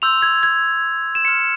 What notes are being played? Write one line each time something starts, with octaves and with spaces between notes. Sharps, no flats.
C6 E6 G6 F7
G#6
G#6
E7
C6 F6 C#7